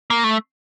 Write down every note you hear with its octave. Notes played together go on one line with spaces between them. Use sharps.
A#3
A3